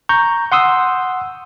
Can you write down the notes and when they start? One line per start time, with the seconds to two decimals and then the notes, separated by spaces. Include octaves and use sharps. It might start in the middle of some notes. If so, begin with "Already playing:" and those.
0.09 A#5 C#6 G6
0.52 F#5 C6 D#6 E6